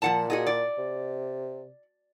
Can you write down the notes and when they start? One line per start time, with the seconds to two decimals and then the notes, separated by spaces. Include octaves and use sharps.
0.02 A#2 F3 F#5 A5
0.30 F#4 G#4 D#5
0.47 D5
0.78 C3